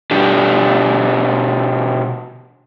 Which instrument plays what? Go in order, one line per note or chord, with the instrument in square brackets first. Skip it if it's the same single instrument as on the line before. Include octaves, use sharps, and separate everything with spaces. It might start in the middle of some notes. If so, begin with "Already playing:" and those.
[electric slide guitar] B2 D4 G4